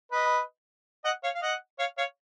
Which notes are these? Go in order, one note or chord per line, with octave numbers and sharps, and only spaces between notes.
B4 D#5
D#5 F#5
C#5 F5
F5
D#5 F#5
C#5 F5
C#5 F5